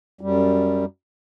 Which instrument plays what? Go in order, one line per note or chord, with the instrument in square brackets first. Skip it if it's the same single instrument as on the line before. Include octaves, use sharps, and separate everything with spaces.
[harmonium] F#2 G3